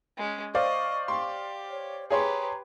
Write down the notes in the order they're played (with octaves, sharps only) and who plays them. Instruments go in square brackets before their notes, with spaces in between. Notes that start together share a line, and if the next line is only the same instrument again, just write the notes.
[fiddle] G#3 C#4
[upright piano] C5 D5 F5 [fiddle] D#5 [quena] C#6
[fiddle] G4 [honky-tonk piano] C6
[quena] C#5
[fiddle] G4 B4 [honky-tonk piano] G#4 C#5 C6 [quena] A#5